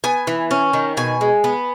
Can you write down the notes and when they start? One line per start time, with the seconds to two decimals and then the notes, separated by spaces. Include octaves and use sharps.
0.04 B3 G#5
0.27 E3
0.51 C#4
0.73 D#3
0.97 B2 G#5
1.21 G#3
1.44 B3